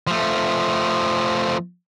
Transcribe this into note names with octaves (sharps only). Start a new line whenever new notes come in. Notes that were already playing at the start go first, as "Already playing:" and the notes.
F3 A3